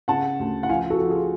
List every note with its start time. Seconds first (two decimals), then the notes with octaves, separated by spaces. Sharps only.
0.08 C#3 F#5 A5
0.40 D2
0.63 F#5
0.69 F3 F5 G#5
0.90 F#4 A4
1.00 F3
1.10 F4 G#4